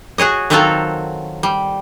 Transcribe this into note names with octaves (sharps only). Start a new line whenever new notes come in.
F#4 G#4 C#5 D#5
D#3 F#3 C4 F4 F#4 A4
G3